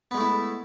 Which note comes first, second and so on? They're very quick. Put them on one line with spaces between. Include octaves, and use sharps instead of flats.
B3 G#3 A3 E4